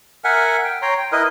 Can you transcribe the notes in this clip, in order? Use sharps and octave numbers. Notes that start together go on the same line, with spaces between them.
A#4 E5 F#5 G#5
G5
C#5 G5 A#5 C6
G5
E4 A#4 B4 D#5